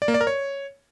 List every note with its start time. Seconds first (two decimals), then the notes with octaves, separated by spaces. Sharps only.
0.02 D5
0.08 A#3
0.14 D5
0.21 A#4
0.27 C#5